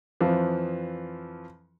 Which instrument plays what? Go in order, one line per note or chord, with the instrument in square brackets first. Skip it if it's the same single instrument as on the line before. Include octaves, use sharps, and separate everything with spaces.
[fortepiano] F2 E3 F3